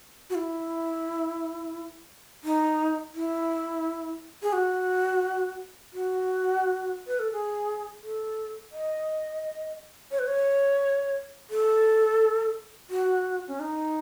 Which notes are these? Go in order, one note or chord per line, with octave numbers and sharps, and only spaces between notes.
F#4
E4
D#4
E4
G#4
F#4
F#4
B4
A4
G#4
A4
D#5
C#5
B4
C#5
A4
F#4
C#4
D#4